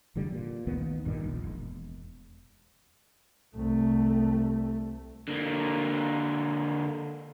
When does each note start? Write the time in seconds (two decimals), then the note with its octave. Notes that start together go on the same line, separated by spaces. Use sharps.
0.15 E1 E2 D3 G3
0.32 A#2
0.67 A1 D2 D#3 B3
1.05 A#1 G2 A#2 D#3
1.24 D#1 A#1
1.44 E1
3.56 C2 A3
5.28 D3 A#3